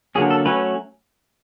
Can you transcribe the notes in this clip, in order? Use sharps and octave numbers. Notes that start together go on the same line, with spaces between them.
D3 F#3 A#3 C#4 G#4
A4
F#3 A3 C#4 B4